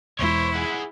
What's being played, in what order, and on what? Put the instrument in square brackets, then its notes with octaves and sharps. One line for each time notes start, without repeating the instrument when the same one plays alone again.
[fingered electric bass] E1 E2 G#3 [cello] E4 [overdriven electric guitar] C5 C#5
[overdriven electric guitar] G#4 F#5